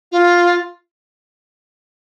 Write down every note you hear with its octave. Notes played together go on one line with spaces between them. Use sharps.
F4